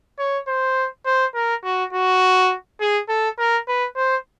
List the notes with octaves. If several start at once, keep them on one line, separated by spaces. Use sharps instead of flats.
C#5
C5
C5
A#4
F#4
F#4
G#4
A4
A#4
B4
C5